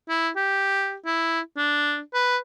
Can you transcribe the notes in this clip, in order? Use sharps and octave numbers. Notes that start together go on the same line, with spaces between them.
E4
G4
E4
D4
B4